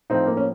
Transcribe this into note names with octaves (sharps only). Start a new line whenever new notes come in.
A2 F3 C4 D#4
A#3
C#4